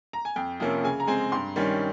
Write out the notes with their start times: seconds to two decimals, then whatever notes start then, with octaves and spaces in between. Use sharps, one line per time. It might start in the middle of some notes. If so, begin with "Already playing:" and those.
0.13 A#5
0.25 G#5
0.36 F2 G5
0.60 C3 F3 A#3 C#4
0.84 C#3 G#5
1.00 A#5
1.07 G#3 C4 G#5
1.32 G2 C6
1.56 D#3 G3 C#4